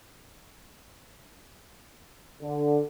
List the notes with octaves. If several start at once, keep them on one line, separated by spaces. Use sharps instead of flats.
D3